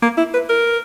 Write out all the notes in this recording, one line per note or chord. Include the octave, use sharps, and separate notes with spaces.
A#3
E4
B4
A#4